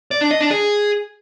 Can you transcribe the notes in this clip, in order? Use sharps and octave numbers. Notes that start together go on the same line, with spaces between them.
D5
D4
D#5
D4
G#4